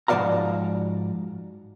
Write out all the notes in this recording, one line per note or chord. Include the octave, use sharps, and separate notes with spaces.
G#2 F3 F#4 D5 F5 A#5